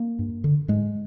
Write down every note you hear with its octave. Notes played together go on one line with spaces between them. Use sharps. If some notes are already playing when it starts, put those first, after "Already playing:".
Already playing: A#3
G2
D3
G#2 G#3